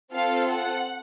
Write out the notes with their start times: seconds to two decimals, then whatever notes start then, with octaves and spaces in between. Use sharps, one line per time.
0.13 C4 F4 A4 F5
0.54 F#5